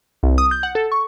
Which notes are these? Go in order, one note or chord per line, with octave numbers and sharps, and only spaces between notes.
C2
D#6
G6
F#5
A4
C#6